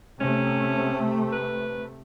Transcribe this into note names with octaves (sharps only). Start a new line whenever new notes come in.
C3 A3 C#4
B4